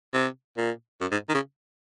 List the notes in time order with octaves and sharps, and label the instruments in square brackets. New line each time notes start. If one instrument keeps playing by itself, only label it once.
[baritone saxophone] C3
A#2
F#2
G#2
D#3
C#3